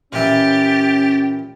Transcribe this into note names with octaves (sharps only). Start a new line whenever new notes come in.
A#2 E3 C#4 G4 A6